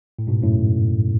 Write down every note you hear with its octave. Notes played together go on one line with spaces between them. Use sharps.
A2
G#2 B2
F#2 A2